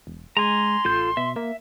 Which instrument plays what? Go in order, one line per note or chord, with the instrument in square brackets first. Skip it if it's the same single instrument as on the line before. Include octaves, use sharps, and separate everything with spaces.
[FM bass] E1
[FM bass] G#3 [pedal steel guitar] G#5 A#5 [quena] C6
[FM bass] A1 [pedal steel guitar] F4 A4 G6
[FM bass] B2 [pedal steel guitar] E5
[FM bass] A#3 [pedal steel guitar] E5